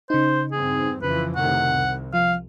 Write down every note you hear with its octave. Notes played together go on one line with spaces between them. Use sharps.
C#3 D#4 C5
E2 G2 C4 G#4
F2 C#3 E3 F3 B4
A2 C3 D#3 F#5
C2
F3 F5